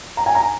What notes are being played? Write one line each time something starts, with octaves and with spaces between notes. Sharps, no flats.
A#5
G#5
A#5